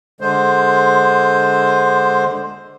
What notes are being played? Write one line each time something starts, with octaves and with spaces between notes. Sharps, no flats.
D3 G#3 C5